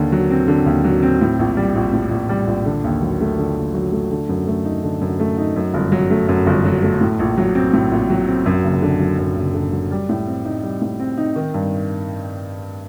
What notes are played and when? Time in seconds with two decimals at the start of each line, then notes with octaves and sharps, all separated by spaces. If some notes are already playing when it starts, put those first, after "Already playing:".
Already playing: D#2 D3
0.12 F#3
0.31 C4
0.48 D3
0.66 D#2
0.84 F#3
1.03 C4
1.21 A2
1.39 A#1
1.57 G3
1.75 A#1
1.93 A2
2.11 A#1
2.29 G3
2.47 A#1
2.66 D3
2.84 D#2
3.02 F#3
3.21 A3
3.39 D3
3.56 D#2
3.74 F#3
3.92 A3
4.11 D3
4.29 F#2
4.47 A3
4.65 D#4
4.83 D3
5.01 F#2
5.20 A3
5.38 D#4
5.56 F#2
5.74 G1
5.92 F#3
6.10 A3
6.29 F#2
6.47 G1
6.65 F#3
6.83 A3
7.01 A2
7.19 A#1
7.37 F#3
7.55 C4
7.73 A2
7.92 A#1
8.10 F#3
8.27 C4
8.46 F#2
8.64 F#1
8.82 D3
9.00 F#3
9.19 F#2
9.36 F#1
9.54 D3
9.73 F#3
9.91 G3
10.09 A2
10.27 C4
10.45 D#4
10.63 G3
10.82 A2
10.99 C4
11.18 D#4
11.36 D#3
11.54 G2